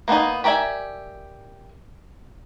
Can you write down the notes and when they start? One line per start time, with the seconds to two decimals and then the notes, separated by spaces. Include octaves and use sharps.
0.08 A#3 B3 C#4 D#4
0.44 G4 A#4 D5 E5 G#5